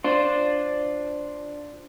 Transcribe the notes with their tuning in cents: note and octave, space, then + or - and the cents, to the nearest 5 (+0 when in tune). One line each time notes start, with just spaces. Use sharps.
D4 +0 F4 +0 C5 +0